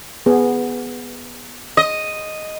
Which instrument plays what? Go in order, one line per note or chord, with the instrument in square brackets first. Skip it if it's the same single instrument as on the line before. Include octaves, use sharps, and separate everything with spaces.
[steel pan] B3 G#4
[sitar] D#5